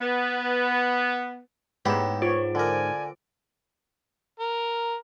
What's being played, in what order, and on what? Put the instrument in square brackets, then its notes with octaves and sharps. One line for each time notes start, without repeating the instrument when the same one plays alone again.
[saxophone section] B3
[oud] G#2 [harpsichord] B3 E4 G4 [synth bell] C#5 G5
[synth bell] F4 C5 D7 [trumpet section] C#5
[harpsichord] D3 A#4 [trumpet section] D5 G#5
[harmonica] A#4